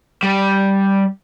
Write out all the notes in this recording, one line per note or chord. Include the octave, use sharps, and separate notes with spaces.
G3